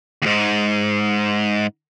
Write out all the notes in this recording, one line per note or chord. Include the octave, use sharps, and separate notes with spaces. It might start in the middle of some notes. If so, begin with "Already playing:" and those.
D#2 G#2